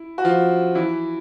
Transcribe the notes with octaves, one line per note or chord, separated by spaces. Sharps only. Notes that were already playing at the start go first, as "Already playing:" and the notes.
Already playing: E4
F#4
F3 F4
E3 E4